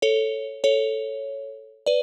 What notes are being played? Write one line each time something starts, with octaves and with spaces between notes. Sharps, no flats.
A4 C#5
A4 C#5
B4 D5